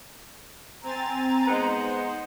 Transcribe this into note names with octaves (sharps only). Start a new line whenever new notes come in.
C4 G#5 A#5 A6
G#3 B3 D#4 C5